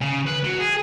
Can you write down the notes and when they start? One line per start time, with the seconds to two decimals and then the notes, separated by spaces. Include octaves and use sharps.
0.01 C#3
0.27 B4
0.44 F#3
0.60 G#4